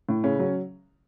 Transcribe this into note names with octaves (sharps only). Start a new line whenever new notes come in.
A2
C#3 C#4
F#3